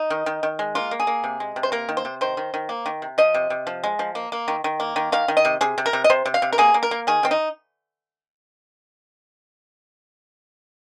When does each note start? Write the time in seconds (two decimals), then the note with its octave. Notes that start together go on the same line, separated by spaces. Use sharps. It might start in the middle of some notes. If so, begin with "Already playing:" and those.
Already playing: D#4
0.10 D#3
0.26 D#3
0.43 D#3
0.59 G#3
0.75 A#3 F4
0.91 A#3
1.00 G#4
1.07 A#3
1.24 C3
1.40 G#3
1.56 C3
1.63 C5
1.72 A#3 A#4
1.89 D#3
1.97 C5
2.05 C3
2.21 D#3 C5
2.37 D#3
2.54 D#3
2.69 A#3
2.86 D#3
3.02 C3
3.18 F3 D#5
3.34 C3
3.50 C3
3.67 F3
3.84 G#3
3.99 F3
4.15 A#3
4.32 A#3
4.48 D#3
4.64 D#3
4.80 A#3
4.96 D#3
5.12 D#3 F5
5.28 D#3
5.37 D#5
5.45 C3
5.61 C3 G#4
5.78 C3
5.86 A#4
5.93 C3
6.04 D#5
6.10 C3 C5
6.25 C3
6.34 F5
6.42 C3
6.53 A#4
6.58 A#3 G#4
6.74 A#3
6.83 A#4
6.91 A#3
7.07 D#3 G#4
7.23 D#3 C4
7.31 D#4